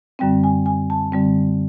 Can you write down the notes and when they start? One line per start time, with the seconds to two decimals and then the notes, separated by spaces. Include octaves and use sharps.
0.19 F#2 D3 G3 C4 G5
0.43 G#5
0.66 G#5
0.90 A5
1.12 F#2 D3 G3 C4